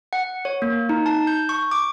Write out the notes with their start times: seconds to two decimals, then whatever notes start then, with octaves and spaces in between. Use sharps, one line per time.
0.13 F#5
0.45 C#5
0.62 A#3
0.89 D#4
1.06 A5
1.27 G6
1.49 C#6
1.72 D6